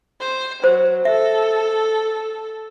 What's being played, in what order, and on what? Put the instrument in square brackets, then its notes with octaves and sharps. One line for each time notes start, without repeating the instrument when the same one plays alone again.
[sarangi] C5
[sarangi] F#3 [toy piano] C5
[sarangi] A4 [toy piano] E5